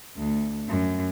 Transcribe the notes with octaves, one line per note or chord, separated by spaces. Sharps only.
D2
F#2